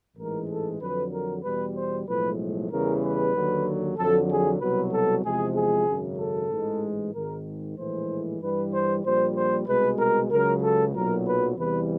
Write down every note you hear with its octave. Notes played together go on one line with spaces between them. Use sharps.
A1 G#2 E3 G#3 A#4
A4
F2 D3 F#3 B4
A#4
E2 B2 G3 B4
C5
B1 A2 F3 G#3 B4
E2 C#3 E3 G3 A#4
B4
D#2 D3 F#3
F2 D3 F#3 A4
G#4
C2 B2 F#3 B4
A4
E2 C3 F3 G#3 G#4
G#4
G#1 F#2 C#3
A4
A1 G#2 E3 G#3
G#1 G#2 D#3 G#3 A#4
A#1 A2 E3 G#3 C5
G2 E3 G3 B4
C5
A#1 A#2 G3 C5
C5
C2 B2 G#3 B4
A#4
C#2 C#3 F#3 A#4
A4
B1 A#2 F#3 A#4
B4
E2 C3 E3 G3 B4